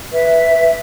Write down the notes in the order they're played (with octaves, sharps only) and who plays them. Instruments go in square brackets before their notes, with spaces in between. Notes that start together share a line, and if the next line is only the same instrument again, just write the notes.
[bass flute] B4 [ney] E5